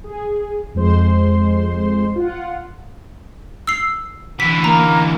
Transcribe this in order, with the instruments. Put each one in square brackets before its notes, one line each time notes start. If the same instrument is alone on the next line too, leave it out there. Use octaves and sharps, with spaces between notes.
[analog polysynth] G#4
F2 G#3 C5 C6
F4 F#5
[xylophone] E6 C7
[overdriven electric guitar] D3 E3 [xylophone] B6
[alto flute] A#3 [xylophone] A#5